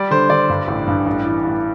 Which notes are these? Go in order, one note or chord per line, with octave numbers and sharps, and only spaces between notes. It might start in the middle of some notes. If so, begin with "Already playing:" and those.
Already playing: G3 D5
D3 C5
D3 D5
G2
A1
G2
A1
E3
A1